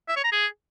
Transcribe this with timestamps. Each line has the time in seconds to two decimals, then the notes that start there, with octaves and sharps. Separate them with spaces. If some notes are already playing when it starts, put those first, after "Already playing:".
0.09 E5
0.17 C#5
0.24 A#5
0.32 G#4